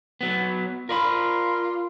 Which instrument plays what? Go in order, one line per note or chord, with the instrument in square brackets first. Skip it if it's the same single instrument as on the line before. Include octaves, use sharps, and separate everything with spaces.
[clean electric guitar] F#3 B3
[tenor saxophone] F4 [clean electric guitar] A#4 D5 B5